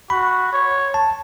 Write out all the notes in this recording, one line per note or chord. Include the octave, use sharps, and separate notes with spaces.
F#4 B5
C#5
A5